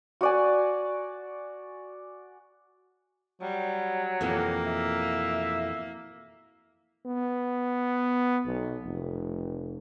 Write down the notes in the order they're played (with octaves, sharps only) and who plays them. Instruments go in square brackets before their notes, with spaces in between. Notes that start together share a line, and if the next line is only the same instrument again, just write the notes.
[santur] F#4 D5 G#5
[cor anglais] F#3 [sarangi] G3
[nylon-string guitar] F2 B2 E3 [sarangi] A#3
[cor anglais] E5
[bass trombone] B3
B1
F1